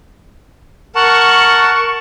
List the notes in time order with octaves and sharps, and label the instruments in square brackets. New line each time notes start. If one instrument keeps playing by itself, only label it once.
[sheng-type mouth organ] A#4 F#5 A5 [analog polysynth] C#6